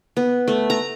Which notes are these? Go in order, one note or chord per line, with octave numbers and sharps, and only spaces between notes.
B3
A3
A#5